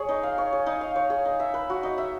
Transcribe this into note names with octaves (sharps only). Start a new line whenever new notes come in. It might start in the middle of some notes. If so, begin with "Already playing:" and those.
Already playing: G#4 C#5
D#4
F5
C#5
G#4
D#4
F5
C#5
G#4
D#4
E5
B4
F#4
D#4
E5